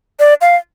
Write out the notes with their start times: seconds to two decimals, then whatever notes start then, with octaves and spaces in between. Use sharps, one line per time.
0.19 D5
0.41 F5